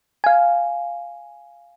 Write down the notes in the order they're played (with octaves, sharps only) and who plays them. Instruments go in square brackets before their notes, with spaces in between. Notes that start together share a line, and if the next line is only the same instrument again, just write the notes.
[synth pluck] F5 G#5